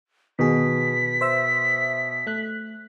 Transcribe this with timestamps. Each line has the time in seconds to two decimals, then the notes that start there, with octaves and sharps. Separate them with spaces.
0.39 B2 D#3 G#4 B6
1.21 C5 E5 E6
2.27 A3 F#6